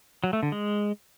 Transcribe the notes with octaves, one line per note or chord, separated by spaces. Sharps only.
F#3
A3
D3
G#3